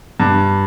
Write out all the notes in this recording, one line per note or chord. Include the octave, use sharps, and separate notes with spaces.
G2